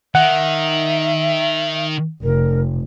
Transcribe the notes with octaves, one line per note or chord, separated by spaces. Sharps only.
D#3 E5 F#5
F1 A#4